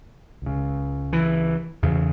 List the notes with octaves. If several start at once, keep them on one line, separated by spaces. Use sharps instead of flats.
C#2 C#3
E3
E2 C#3